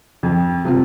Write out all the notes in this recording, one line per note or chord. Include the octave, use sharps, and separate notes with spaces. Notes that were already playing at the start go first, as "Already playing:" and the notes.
F2
C3 G3 C4 F4